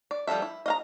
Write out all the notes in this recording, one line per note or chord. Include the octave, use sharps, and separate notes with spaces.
D5
F3 G3 E4 A4 E5
E4
D#5 F5 A#5